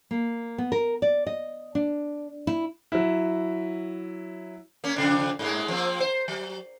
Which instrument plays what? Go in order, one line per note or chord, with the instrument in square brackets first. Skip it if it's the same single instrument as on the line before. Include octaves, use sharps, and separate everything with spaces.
[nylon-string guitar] A#3
B3
A#4
D5
D#5
D4
E4
[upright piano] F#3 E4
[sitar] A#3 C#4
F2 C#3 D4
G#2 G#3 A#3
F3 A#3 C4
C5
F#3